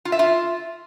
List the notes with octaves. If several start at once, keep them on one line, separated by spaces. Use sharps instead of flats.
F4
E5
F4